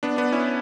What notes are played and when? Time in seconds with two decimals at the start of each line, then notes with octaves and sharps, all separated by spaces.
0.03 B3 D4
0.17 B3 D4
0.32 C#4 E4